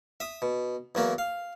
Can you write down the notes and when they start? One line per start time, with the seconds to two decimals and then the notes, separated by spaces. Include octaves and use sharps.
0.20 E5 D#6
0.42 B2
0.95 E2 F#3 A#3
1.18 F5